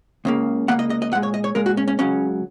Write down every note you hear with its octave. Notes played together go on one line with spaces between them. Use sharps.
C#2 C#3 A#3
C#2 C#3 A#3 F#5
D#5
D#5
D#5
A#2 G#3 F#5
C#5
D#5
C#5
A#2 G#3 A#4
F#4
C#4
C#4
C#2 C#3 F#3 C#4